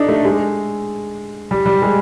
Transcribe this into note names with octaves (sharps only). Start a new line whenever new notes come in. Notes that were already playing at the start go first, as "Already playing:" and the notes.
Already playing: D4 D#4 A4
A3
G#3
G3
G3
G#3